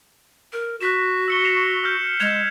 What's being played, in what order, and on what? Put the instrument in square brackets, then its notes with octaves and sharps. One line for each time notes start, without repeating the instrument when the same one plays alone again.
[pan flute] A#4
[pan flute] F#4 [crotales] F#6 B6 E7
[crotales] E6 C#7 G7
C7 E7 F7
E6 F6 G6
[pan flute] G#3 [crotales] G#6 E7 F7